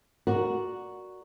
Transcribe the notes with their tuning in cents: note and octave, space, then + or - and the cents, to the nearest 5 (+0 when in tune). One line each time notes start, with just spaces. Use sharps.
F#4 +0 A#4 +0 D5 +0